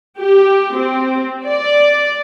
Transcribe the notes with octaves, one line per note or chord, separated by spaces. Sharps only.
G4
C4
D5